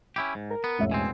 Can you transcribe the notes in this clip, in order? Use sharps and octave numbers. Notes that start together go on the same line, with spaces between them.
C#4 E4 G4
G#2
A#4
B3
E1 A1 E5
B2 C4 G#5